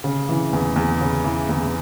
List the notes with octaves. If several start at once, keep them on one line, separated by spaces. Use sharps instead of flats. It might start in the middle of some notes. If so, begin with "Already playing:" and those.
C#3
E3
E2
E2
C#3
E3
E2